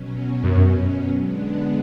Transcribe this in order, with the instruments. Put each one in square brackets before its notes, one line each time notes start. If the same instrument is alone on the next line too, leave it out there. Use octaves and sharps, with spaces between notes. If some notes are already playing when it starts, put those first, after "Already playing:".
Already playing: [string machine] B2 F#3 C#4
[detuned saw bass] F#2
[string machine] D3 G#3 B3 D4